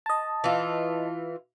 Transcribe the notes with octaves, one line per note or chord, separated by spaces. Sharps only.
D#5 A5
E3 F4